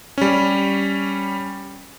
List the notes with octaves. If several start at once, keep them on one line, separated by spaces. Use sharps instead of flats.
G3 C#4